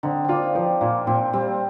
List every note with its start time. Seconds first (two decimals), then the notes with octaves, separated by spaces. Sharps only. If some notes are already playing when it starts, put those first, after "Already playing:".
0.03 D3 C4 D#4
0.25 A#3 C4 D4 F4
0.55 F3 C4
0.81 A#2 A#3
1.07 A#2 C4
1.33 G3 C4